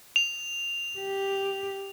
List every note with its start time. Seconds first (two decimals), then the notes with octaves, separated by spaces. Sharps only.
0.16 F7
0.99 G4